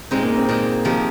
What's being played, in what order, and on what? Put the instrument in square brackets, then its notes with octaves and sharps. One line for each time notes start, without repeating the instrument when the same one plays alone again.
[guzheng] A#2 G#3 D#4 [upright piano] C4
[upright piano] A#3
C4
[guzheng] A#2 G#3 D#4
C3 F3 A#3 D#4